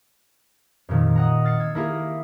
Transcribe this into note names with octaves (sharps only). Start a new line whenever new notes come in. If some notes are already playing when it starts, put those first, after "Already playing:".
F2 A#2 D#3
D#5 F#5 A#5
F6 A6 C7 C#7
E6 G#6
A#3 E4 G#4 A#4